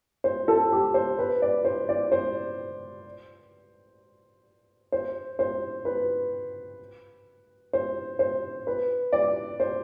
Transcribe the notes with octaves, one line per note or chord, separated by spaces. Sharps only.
C5
A4
G4
C5
B4
D5
C5
D5
C5
C5
C5
B4
C5
C5
B4
D5
C5